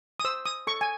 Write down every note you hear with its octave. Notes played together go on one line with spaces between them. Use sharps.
D#6
C5 E6
D#6
A4 C#6
G#5